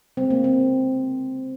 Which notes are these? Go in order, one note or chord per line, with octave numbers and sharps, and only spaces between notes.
C#3 G#3 C4
A#3
C4